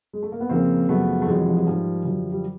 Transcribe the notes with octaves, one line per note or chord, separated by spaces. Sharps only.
G#3
A3
A#3
B3
F2 C#3 F3 A#3 C4
F#2 C#3 F3 A3 B3
A3
F2 C3 E3 F#3 G#3
F3
F#3
G#2 D#3 F3 G3
F#2 D3 F3
G3